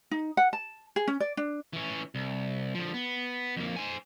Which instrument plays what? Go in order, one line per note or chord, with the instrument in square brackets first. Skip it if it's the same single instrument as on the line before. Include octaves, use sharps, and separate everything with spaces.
[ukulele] D#4
F#5
A5
G#4
C#4
D5
D4
[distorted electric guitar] E3 C#4
C2
D3 F3
B3
F2 A#3
C5 G#5